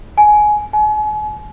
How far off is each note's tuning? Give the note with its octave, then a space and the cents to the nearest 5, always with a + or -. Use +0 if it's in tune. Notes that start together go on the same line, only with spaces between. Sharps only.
G#5 +15
G#5 +40